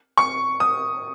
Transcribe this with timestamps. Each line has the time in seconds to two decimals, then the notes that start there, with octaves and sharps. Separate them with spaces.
0.18 C#6
0.60 D#6